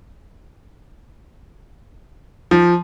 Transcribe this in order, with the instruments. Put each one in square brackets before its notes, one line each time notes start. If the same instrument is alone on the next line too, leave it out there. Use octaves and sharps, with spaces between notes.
[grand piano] F3